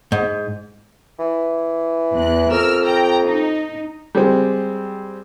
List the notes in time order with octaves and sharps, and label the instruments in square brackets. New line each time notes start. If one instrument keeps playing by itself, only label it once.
[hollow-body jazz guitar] G#2
[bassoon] E3
[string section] E2 F#6
[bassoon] F2 [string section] A#4 E6 F6
[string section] G5 A#5
D#4
[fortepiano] G3 G#3 C4